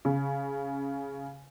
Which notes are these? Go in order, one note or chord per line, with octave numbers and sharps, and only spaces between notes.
C#3